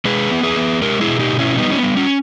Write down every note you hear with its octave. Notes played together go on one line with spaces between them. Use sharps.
G#3 G#4 B4
B3
G#4 B4
B3
G#3 G4 A#4
E4 G#4
B2
D#4 G4
B2
C#4 E4
G3 B3 D#4
C#4
B3
G3
C#4